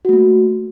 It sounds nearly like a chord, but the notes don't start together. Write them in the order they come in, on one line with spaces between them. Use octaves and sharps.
F#4 A3 A#3